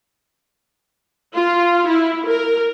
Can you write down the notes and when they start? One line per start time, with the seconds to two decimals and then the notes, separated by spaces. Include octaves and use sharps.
1.34 F4
1.88 E4
2.26 A#4